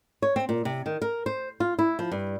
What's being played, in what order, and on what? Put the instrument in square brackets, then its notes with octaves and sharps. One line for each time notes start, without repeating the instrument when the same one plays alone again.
[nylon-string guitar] C#5
C4
A#2
C3
D#3
A#4
C5
F4
E4
F3
G2